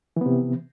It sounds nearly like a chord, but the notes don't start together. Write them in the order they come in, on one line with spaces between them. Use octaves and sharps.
E3 B3 C3